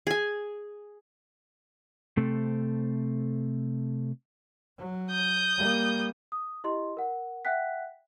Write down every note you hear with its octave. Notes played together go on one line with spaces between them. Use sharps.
G#4 G#5
C3 A3 C4 A4
F#3
D#6 G6
G3 A#3
D#6
E4 G4 D#5 C6
A#4 F#5
E5 F#5 G5 F#6 B6